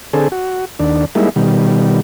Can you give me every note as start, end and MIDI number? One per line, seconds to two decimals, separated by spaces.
0.13 0.28 50
0.13 0.28 60
0.13 0.28 68
0.13 0.28 69
0.32 0.65 66
0.79 1.05 39
0.79 1.05 62
1.15 1.29 55
1.15 1.29 56
1.15 1.29 58
1.15 1.29 63
1.15 1.29 64
1.36 2.01 47
1.36 2.01 51
1.36 2.01 55